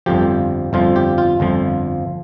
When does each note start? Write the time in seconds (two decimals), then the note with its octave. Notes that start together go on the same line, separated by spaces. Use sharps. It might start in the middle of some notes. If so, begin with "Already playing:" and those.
0.06 G1 F2 F3 G4
0.73 G1 F2 F3 F4
0.96 G4
1.18 F4
1.40 G1 F2 F3